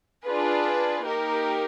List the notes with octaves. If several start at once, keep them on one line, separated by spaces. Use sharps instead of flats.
D4 F4 G#4 B4
A#3 D#4 G4 A#4